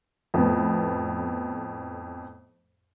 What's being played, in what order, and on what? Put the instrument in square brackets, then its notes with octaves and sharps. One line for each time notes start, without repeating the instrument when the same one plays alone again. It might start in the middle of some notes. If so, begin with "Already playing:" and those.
[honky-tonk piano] F2 A2 B3